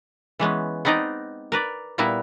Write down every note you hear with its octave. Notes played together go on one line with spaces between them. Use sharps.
E3 G#3 B3 C#4
B3 C4 D#4 D5 D#5 A#5
A#4 B4 D5
A#2 G3 B3 E4 A#4